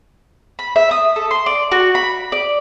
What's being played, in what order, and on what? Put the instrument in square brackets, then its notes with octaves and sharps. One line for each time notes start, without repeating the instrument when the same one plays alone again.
[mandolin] B5
E5
D#6
A4
C6
D5
F#4
B5
D5